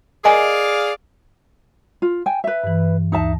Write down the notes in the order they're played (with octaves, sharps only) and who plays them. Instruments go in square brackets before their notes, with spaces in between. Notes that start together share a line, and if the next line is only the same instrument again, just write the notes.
[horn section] G#4 D5 F5 [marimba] A#4 D#5 G#5
[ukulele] F4
G5 G#5
B4 E5
[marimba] G2 E3
[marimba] D2 [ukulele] D#4 E5 A5